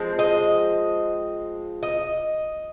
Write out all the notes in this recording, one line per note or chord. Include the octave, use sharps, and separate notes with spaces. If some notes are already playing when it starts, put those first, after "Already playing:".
Already playing: F3 G#3 C4
D#5
D#5